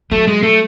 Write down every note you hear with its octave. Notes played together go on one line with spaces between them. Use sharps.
F#3 A3
G#3
A3